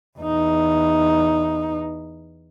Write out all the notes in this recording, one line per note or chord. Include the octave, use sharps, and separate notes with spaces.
E2 D#4